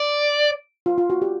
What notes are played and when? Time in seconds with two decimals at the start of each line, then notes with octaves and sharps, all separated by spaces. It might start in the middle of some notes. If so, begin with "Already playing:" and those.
Already playing: D5
0.86 F4
0.98 F4
1.10 F#4
1.22 G4